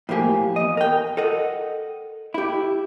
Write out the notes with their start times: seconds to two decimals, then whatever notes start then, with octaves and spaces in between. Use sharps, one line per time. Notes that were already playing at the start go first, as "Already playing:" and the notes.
0.09 A2 F3 A#3 G4 G#5
0.56 E2 D#5
0.77 A#4 G5
1.17 A4 A#4 D#5 F#5
2.34 E4 G4